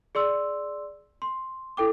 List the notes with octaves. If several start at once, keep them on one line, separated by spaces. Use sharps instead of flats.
G#4 D5 C6 E6
C6
E4 A4 G5 D6